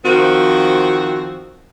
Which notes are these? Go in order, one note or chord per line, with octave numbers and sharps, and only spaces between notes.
D#3 F3 C4 F#4